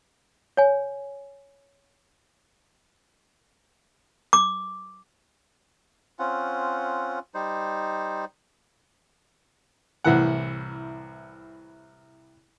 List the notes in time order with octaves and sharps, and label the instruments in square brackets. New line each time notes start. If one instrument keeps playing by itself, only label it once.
[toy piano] C#5 G#5
D6
[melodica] C4 C#4 F4 F#5
G3 D#4 C5
[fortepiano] C2 A2 E3 F#5